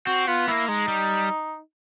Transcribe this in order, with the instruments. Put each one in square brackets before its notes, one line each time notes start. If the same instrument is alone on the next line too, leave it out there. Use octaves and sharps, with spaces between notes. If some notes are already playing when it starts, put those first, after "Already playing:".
[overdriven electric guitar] C4 [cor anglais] F#4
[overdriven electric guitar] B3 [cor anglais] F4
[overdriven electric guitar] A#3 [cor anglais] E4
[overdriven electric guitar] G#3 [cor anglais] D#4
[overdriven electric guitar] G3